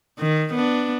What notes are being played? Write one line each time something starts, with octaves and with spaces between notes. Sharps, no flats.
D#3
B3 D4